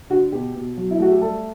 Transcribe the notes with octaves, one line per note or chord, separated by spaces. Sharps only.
D3 F#4
B2 G4
B2
F#3
E4
A3 F#4
G4
G3 A4